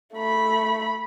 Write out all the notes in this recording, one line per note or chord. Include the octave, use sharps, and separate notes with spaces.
A3 B5